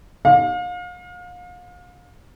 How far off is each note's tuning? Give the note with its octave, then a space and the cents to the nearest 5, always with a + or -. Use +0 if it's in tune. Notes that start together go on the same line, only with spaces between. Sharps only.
F5 +35